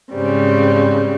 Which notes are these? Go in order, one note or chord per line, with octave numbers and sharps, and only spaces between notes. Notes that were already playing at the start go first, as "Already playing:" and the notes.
G#2 C#3 G3 C4